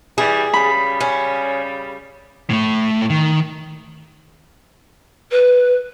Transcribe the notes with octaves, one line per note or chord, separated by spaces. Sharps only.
E3 G3 G#4
C#3 G3 B5
C#4
A2 A3
D#3
B4